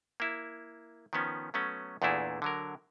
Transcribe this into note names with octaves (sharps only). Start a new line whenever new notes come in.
A#3 E4
D#3 F3 B3 C#4
F#3 A3 B3 C#4
E2 A#2 A3 D4 E4 G#4
D3 F#3 A#4